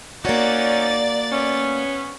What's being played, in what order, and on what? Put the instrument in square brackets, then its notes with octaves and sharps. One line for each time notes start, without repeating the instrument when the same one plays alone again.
[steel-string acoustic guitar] A#3 F#4 [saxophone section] C#4 D#4 C#5 [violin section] D5 A6
[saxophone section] B3 C#4